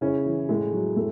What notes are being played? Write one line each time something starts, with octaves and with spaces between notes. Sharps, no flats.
C#3 C#4 E4
E3
A2 G#3
F#3
A2 A3